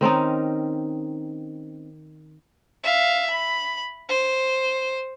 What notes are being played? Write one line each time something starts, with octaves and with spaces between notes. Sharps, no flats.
D#3 C4 C#4 D#4
E5 F5
B5
C5